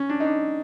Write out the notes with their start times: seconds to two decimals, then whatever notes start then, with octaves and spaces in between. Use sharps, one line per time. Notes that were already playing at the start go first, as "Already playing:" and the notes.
Already playing: C#4
0.10 D4
0.20 D#4
0.25 D4